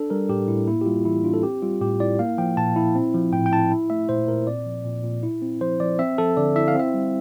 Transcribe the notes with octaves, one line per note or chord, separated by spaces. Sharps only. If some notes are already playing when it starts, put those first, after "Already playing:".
Already playing: D4 A4
G3 A#4
A2 G4
A2 E4
A#3 E4
G4
G3 F4
E3 E4
D4 F4
A4
C4 G4
G3 F4
A2 G4
E4 D5
A#3 F5
F3 G5
A#2 A5
E4
C4
F3
A2 G5
G5
E4 A5
E4
A3 E5
A#2 C5
A#2 A#4
C4 D5
F3
A#2
A#2
E4
C4
F3 C5
F3 D5
C4 E5
F3 A4
D3 D5
E4 E5
F5
C4 E5
G3